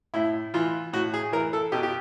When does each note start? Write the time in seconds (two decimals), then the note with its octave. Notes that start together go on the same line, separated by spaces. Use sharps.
0.14 A2 E4
0.54 E3 F4
0.93 A2 F#4
1.14 G#4
1.32 E3 A#4
1.53 A4
1.72 B2 G4
1.83 G4